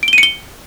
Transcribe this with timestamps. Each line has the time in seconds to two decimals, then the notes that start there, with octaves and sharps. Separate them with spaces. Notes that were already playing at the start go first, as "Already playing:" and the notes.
0.03 D7
0.08 G7
0.13 D#7
0.18 C#7
0.23 G7